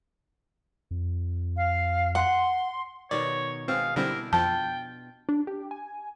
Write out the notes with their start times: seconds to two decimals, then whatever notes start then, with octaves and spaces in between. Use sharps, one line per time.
0.91 F2
1.57 F5
2.15 F#5 C6
3.11 B2 D#3 C#5 D5
3.68 B2 G#3 C4 F5
3.96 D3 G3 C4 D4 E4 A#4 E5
4.33 F2 F3 F4 G5 A5
5.29 D4
5.47 G4
5.71 G#5